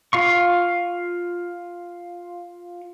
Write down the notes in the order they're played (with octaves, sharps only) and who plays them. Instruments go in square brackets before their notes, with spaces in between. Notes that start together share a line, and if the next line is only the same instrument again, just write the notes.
[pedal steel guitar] F4 F5 C#6